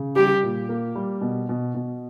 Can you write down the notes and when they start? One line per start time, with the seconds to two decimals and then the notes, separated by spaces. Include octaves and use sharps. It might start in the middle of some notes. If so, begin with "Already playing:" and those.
Already playing: C#3
0.16 G3 G4
0.43 A#2
0.69 A#3
0.95 G3
1.21 B2
1.49 B2
1.75 B2